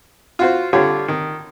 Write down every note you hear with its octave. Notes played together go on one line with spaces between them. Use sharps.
F4 F#4 C5
D3 G3 F4 G4 C#5
D#3